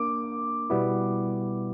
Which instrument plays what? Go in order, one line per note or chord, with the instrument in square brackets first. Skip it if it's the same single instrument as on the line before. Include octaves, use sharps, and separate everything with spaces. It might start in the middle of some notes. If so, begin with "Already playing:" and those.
Already playing: [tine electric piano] A#3 D4 A#4 [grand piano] D6
[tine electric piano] B2 G3 B3 E4